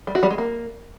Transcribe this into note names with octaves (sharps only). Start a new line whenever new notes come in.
G3
F#4
G3
G#3
A#3